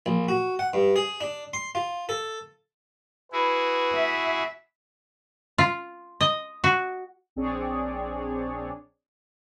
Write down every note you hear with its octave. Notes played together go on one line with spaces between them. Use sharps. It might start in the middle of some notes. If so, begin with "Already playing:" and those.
A#1
F#4
F#5
G2
G#4
D4
C6
F4
A4
E4 F#4 G#4 B4
E5
F4
D#5
F#4
A#1 C4 D4 G#4 C#5 D5